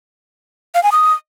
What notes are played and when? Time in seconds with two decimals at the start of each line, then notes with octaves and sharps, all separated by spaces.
0.75 F5
0.83 G#5
0.92 D#6